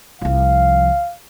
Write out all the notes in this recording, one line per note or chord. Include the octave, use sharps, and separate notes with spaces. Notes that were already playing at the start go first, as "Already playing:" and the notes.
C2 F3 F5